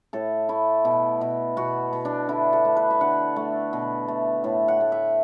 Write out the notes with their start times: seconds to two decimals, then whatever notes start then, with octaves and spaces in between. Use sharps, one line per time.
0.13 A2 A4
0.49 A3 E4
0.85 B2
1.21 B2
1.57 B2 F#4
1.93 B2
2.05 D4
2.29 D3 E4
2.53 A4
2.65 A3
2.76 B4
2.90 E5
3.01 D3 F#5
3.36 A3
3.73 B2
4.08 A3
4.44 A2
4.68 F#5
4.81 A3
4.92 E5